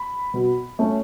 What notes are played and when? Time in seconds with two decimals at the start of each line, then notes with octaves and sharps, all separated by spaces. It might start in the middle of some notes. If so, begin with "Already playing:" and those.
Already playing: B5
0.34 B2
0.79 A3 C#4